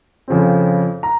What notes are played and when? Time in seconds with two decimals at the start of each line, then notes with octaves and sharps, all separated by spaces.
0.28 F2 C#3 F3 C4
1.03 A#5